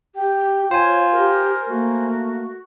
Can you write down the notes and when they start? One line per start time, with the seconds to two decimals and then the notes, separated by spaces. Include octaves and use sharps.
0.15 G4 G5
0.71 F4 C5 C#5 G#5
1.12 G4 A#4
1.69 A3 A#3 F#4